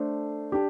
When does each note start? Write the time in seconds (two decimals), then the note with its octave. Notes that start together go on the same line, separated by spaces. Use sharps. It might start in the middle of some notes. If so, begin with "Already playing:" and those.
Already playing: A3 D4 A4 C5
0.52 D4 G4